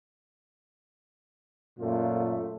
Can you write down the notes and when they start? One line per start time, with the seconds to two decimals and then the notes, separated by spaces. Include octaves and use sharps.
1.79 F#2 A#2 A3 F4